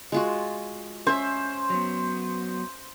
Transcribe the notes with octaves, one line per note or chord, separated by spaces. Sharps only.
G#3 F4 F#4
C#4 C5 E5
F#3 B3